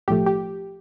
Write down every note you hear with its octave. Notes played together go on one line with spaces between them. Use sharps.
B1 A2 F3 A3 G4
G4